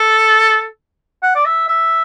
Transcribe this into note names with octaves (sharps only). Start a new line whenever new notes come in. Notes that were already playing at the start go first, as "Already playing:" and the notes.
Already playing: A4
F#5
D5
E5
E5